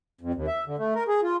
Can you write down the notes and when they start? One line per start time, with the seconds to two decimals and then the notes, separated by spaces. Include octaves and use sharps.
0.21 F2
0.34 D#2
0.47 E5
0.66 D3
0.79 A3
0.95 A#4
1.08 G#4
1.23 F4